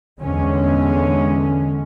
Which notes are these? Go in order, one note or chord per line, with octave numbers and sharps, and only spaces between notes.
E2 D3 G#3 C#4